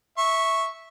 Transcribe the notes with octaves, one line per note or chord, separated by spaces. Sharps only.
E5 C#6